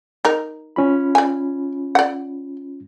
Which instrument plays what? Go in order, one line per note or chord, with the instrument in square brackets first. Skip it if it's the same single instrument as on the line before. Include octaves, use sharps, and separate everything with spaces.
[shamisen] D#4 A#4
[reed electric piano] C#4 F4 B5
[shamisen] D5 G#5
D5 F#5